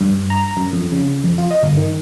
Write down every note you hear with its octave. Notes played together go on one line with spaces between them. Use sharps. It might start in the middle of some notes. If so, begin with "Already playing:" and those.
G2
A#5
F#2
F2
C#3
F2
F4
D#5
G1
D#3